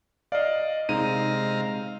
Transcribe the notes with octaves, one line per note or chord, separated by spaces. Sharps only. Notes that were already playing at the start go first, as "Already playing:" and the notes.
D5 D#5 F5
C3 G#3 D#4 F5 A#5 D#7